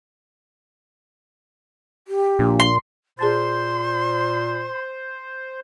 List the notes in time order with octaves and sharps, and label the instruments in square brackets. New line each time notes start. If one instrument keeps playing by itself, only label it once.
[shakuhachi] G4
[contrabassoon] A#1 [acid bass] A#2
[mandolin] C6
[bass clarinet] A#2 [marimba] G#4 A5 A6 [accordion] C5 [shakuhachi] C6